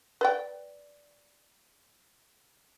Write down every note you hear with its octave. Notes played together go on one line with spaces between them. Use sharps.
B4 D5 G5